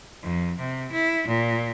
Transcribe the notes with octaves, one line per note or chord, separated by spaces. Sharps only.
F2
C3
E4
A#2